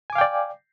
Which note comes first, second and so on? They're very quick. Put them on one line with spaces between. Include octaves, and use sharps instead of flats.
G#5 D6 F5 G5 D5